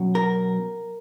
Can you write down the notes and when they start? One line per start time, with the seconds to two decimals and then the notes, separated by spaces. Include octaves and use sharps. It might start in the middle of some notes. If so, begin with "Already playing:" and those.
Already playing: B2 F#3 C#4
0.15 A#4